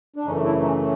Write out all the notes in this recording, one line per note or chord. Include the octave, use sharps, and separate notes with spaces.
D4
F#2 C#3 E3 A3 C#4 D#4
D4 E4
C#4 D#4
C#4